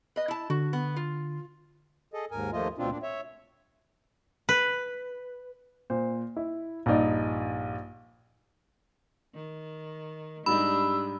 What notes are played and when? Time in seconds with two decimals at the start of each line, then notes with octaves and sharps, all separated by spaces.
0.16 B4 D#5
0.28 E4 A5
0.50 D3 F#4
0.73 B3
0.96 F4
2.13 G#4 A4 D#5
2.31 D#2 G#2 A#4 G#5
2.52 D#2 F3 A3 A#3 F4 D#5
2.78 D2 B2 C4 D4 F4
2.91 A#2 D4
3.03 C#5 E5
4.49 B4
5.90 A#2 C5
6.36 E4
6.86 A#1 G2 D#4 D5
9.34 D#3
10.46 G#2 G3 D4 D#4 G4 B5 E6